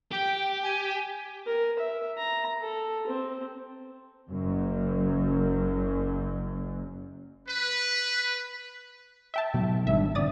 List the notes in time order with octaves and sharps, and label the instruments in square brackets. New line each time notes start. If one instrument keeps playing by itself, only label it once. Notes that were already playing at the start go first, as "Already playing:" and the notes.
[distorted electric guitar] G4 [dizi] G5
[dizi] G#5
[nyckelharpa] A#4
E5
A#5
A4
C4
[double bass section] F#1 F#2
[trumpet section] B4
[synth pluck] E5 G5 A5
[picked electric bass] B2 F#3
[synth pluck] G#1 E5 [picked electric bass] D#3 G3 D4
[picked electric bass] G2 D3 C4 [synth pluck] D5 D#6 A6